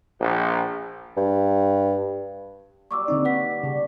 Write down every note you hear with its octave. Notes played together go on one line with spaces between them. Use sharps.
A#1
G2
A#2 F#3 G3 C#6 D6 E6
D3 C4 D#4
B4 F#5 B6
G2 C#3 D4 G5